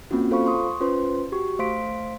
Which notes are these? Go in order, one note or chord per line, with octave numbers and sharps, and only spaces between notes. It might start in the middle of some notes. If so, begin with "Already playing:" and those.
A#3 C4 C#4 F4 F#4
F4 A4 C5 F5 B5 C#6
C6 C#6 D#6
C#4 F4 B4 C5 C6
F#4 G4 C#6
A3 C5 F5 C6 B6 D7